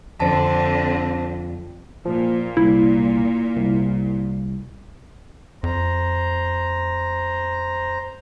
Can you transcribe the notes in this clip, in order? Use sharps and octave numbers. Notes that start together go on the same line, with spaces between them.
F2 D3 C4 C5 A5
A#2 F3
C2 E4
C2
F2 C5 A#5